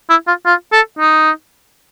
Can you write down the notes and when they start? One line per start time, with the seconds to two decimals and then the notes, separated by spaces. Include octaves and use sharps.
0.10 E4
0.28 F4
0.46 F4
0.72 A4
0.99 D#4